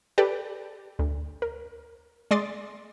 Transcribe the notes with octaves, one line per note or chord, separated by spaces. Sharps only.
G4 A4 B4 D5
D2
A#4
G#3 D5 C6 D#6 A6